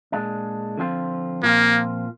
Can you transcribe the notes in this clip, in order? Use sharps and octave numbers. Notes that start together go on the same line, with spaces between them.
A#2 G#3 D4
D3 F3 C4 F4
A#2 F3 A#3 C4 F4